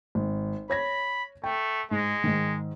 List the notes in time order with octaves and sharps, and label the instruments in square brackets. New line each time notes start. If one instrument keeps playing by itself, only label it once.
[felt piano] G#1
[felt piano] C#5 G#6 A#6 [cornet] B5
[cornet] A3 [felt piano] G5
[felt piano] G#2 [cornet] G#3
[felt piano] G#2 D#3